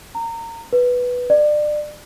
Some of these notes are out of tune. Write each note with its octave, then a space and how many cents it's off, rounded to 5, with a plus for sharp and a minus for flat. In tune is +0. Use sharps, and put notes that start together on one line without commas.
A#5 -25
B4 +0
D5 +30